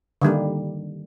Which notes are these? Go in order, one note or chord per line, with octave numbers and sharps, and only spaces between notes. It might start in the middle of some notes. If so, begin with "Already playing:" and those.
D3 D#3 G3 A#3